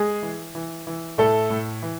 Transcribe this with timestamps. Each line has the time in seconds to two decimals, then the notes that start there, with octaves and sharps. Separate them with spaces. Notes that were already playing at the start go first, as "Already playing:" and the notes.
Already playing: G#3 G#4
0.22 E3
0.55 E3
0.87 E3
1.18 A2 A3 A4
1.50 A2
1.82 E3